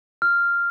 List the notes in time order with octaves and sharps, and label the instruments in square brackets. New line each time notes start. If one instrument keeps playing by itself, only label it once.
[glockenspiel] F6